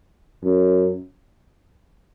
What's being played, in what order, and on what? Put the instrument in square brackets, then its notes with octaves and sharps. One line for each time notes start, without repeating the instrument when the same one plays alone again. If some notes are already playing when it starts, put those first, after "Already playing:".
[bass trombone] F#2